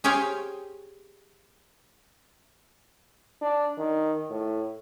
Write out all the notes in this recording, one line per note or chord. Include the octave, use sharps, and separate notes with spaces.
G4 G#4 C5 C#5 F5 G5
D4
D#3
A2